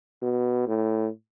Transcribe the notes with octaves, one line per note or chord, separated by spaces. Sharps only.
B2
A2